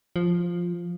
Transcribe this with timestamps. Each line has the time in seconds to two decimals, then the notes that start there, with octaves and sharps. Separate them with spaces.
0.16 F3